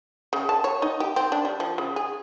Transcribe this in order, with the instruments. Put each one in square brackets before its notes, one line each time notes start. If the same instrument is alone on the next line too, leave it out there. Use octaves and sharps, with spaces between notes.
[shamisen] C#3
A5
C#5
D#4
G4
C4
D4
G3
F3
C#3
G#4